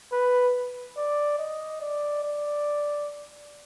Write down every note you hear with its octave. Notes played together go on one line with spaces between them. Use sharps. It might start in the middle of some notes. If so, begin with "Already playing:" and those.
B4
D5
D#5
D5
D5